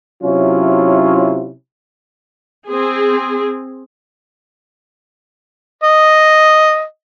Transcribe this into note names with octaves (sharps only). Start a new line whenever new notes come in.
C3 F#3 C#4 E4 F4
C4 G#4
D#5